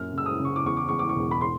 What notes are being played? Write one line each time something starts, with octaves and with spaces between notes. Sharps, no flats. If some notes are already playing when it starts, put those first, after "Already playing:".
Already playing: F#2 A#2 F6
C#3
E6
D#6
C#3
C#6
D6
E2 C#6
D6
E2 C#6
D6
C#6
E1
B5
C6